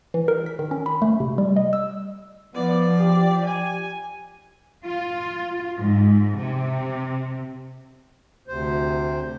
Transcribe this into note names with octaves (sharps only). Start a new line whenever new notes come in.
E3
A#4
B6
D#3
C#4
B5
A3
C3
G3
D#5
E6
F3 B3 D5
G4
G#5
F4
G#2
C3
D2 C3 C5